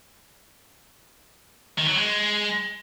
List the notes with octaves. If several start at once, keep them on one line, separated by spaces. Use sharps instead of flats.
D#3
F#3
G#3